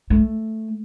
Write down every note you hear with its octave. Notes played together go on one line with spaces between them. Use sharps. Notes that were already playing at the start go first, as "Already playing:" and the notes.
A3